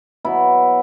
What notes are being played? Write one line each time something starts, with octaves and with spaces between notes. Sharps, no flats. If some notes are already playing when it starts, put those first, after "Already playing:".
B2 F#3 E4